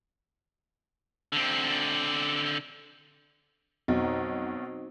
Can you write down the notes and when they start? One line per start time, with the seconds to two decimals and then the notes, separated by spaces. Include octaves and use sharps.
1.33 D3 C4
3.88 B1 F2 B2 C4 D#4 F#4